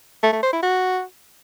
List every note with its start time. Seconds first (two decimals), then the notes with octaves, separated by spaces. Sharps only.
0.23 A3
0.33 A3
0.43 C5
0.53 E4
0.63 F#4